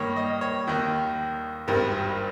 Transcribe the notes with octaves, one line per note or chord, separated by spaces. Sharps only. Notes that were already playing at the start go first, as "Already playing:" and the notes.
Already playing: G2 D#3 A#3 C#5
D#5
C#5
D#2 D#3 A#3
G#1 G2 G3 A#4